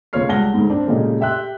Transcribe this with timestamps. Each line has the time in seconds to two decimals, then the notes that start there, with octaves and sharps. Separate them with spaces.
0.13 D2 C#3 F4 C#5 F6 C7
0.29 C#2 G3 F#5 A5 A#6 G7
0.54 D2 G#2
0.70 C4 D4
0.87 A#2 C#3 G#3 A3 G4 D#5
1.21 G4 E5 G5 C6 F#6